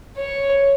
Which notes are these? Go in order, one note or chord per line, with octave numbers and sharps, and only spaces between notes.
C#5